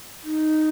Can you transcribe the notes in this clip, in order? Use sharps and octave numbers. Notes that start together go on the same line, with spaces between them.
D#4